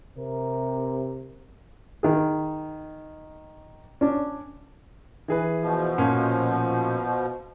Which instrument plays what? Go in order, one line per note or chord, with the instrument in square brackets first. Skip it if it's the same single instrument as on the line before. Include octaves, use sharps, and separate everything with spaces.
[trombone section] C3 A#4
[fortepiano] D#3 G#4
C#4 D4
[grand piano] E3 G#4 B4
[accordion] B2 F3
[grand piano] A#2 C#4